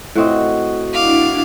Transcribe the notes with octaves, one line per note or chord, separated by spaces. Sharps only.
A2 C4 F#4 D#5
D4 E4 F5 D6